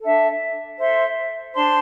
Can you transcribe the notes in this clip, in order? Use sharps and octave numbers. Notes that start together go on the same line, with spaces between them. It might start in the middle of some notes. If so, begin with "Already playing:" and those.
D4 A4 E5
A4 C5 E5 C6
D4 C5 A5 C6